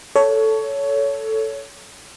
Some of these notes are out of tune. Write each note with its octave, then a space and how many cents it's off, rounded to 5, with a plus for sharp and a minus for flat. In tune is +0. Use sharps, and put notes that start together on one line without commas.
A4 +0 C#5 +15